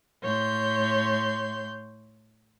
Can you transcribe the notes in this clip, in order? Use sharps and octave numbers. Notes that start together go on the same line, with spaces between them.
A2 C#5 C6 G6